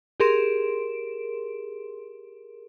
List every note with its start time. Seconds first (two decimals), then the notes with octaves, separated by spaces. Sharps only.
0.20 G4 G#4 A#4 C6 D7 E7